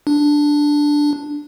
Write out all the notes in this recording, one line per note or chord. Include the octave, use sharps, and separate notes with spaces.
D4